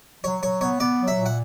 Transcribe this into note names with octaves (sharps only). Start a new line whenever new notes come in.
F#3 C#5
F#3 C#5
B3 C#5
B3 D5
F#3
E5
A#2
F#5